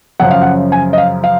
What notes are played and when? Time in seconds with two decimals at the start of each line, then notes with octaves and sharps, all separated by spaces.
0.20 F#2 C#3 F3 F#5
0.31 F5
0.42 F#5
0.72 G#5
0.93 D#5
0.98 F5
1.24 F5